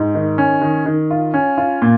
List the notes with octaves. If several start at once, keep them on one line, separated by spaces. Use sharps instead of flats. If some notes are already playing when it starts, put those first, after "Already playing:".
Already playing: G#2
D#3
C#4
D#3
D#3
F4
C#4
F4
A#2